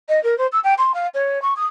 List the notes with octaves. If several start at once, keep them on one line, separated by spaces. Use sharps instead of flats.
D#5
A#4
C5
E6
G5
C6
F5
C#5
C#6
D#6